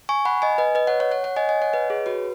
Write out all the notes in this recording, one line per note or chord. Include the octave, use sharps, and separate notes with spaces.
G#5 C#6
F#5 B5
D#5 G#5
B4 D#5
B4 D#5
C#5 F#5
C#5 F#5
C#5 F#5
C#5 F#5
D#5 G#5
D#5 G#5
C#5 F#5
B4 D#5
G#4 C#5
F#4 B4